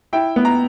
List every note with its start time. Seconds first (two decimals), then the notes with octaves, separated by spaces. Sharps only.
0.13 E4 G5
0.36 B3
0.45 A#5